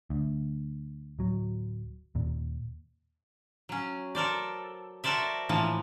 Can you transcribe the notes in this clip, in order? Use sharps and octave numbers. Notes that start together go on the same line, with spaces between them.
D2
D1 F#3
D#2 A#2
F#3 C#4
A4 A#4 C5 D5
F#4 A4 A#4 C5 D5 E5
A2 E3 F3 A#3 A5